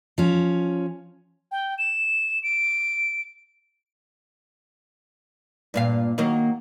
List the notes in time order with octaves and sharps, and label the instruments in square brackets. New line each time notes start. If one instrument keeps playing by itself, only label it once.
[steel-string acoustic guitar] F3 C#4
[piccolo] G5
E7
D7
[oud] G2 A#2 F5
D#3 F#3 A#3